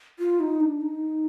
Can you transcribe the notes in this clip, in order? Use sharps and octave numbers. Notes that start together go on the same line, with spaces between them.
F4
D#4
D4
D#4